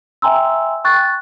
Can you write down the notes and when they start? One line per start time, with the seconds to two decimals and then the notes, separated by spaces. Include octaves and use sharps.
0.22 E5 G5 G#5 A#5 C6 E6
0.84 G5 C#6 F#6 A6